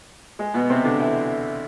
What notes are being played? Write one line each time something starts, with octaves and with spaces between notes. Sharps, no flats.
G#3
B2 B3
C3 C4
D3 D4
E3 E4